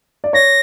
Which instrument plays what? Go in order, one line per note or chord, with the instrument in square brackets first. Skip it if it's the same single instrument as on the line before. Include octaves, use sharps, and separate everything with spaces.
[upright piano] D5
[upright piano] C#5 [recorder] A#6